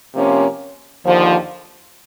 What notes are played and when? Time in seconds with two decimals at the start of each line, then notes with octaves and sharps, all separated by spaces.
0.14 C3 F3 A#3 C#4
1.04 D#2 D3 F3